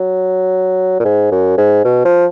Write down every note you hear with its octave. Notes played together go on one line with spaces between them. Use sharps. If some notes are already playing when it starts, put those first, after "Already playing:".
Already playing: F#3
A#2
G#2
F#2
G#2
B2
F3